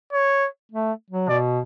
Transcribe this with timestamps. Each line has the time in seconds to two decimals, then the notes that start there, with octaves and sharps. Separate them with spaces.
0.13 C#5
0.72 A3
1.10 F#3
1.29 B2 D5